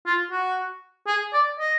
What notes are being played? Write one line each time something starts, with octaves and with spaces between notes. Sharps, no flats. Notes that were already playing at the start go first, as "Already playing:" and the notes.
F4
F#4
G#4
D5
D#5